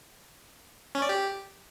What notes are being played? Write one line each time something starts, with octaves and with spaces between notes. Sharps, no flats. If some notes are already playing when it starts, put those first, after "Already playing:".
C#4
D5
G4